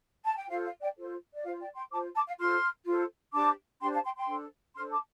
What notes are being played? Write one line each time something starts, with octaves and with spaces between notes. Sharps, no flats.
A5
G5
F4 A4 C5 F5
F5
D5 G5
F4 A4 C5
D5
F4 C5 F5
D5 G5
G5 C6
F4 C5 A5 D6
A5 D6
F5
F4 A4 C5 C6 F6
F4 A4 C5
D4 G4 C5 A5 D6
D4 G4 C5 G5 C6
F5 A5
G5 C6
G5 C6
D4 A4 C5
D4 A4 C5 C6 F6
A5 D6